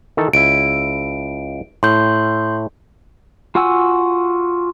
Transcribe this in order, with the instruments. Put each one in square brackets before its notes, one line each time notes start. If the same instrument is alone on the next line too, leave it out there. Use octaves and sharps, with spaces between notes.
[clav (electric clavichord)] D#3 E3 A4
[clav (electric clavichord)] C#2 E4 [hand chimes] D7
[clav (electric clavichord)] A2 [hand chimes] C6 G6
[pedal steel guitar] F4 F#4 F#5 G#5 E6